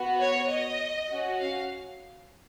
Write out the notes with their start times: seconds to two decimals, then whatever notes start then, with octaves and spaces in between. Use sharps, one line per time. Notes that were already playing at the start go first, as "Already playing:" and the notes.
Already playing: B3 F#4
0.20 C#5
0.49 D#5
1.09 C#4 F#4
1.39 F5